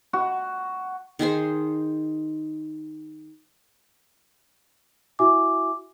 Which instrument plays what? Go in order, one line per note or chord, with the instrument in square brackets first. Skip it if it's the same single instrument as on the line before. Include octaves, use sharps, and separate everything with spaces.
[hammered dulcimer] F#4
[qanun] D#3 D#4 G#4 C5
[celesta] E4 F#4 E5 G#5 D6